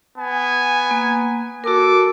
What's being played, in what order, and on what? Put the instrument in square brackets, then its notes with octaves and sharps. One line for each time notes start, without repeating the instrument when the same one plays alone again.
[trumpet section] B3 G#5
[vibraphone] A#3
[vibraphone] F#4 A#4 [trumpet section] A4 D6